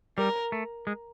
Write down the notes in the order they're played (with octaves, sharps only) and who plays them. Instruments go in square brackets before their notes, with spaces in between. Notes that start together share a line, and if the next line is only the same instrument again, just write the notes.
[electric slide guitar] G3 [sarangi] A#4
[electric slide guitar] A3
G#3